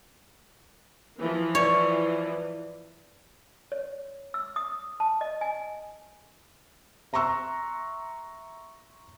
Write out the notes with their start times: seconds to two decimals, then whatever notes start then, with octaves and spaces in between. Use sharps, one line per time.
1.19 E3 F3
1.55 E4 B4 C#5 D5
3.72 C#5
4.34 E6
4.56 D#6
5.00 A5
5.21 D#5
5.41 G#5
7.13 E5 A#5 C6 C#6 E6 F#6